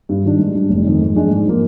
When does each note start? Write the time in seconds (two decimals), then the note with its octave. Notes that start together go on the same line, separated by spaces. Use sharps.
0.09 G2
0.24 D#3 G3 D4
0.39 G#2
0.55 G3 D4
0.69 F1
0.86 F2 D#3
1.01 G#2
1.15 F3 G#3 D4 G#4
1.31 G#2
1.46 F3 A#3